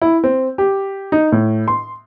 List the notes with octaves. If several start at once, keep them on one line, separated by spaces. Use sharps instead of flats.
E4
C4
G4
D#4
A2
C6